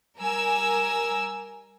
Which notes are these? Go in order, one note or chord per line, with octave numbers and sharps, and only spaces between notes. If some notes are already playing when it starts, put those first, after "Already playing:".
G3 A#4 G#5 E6